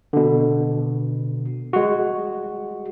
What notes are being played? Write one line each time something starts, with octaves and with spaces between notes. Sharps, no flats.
B2 D3
G#3 F#4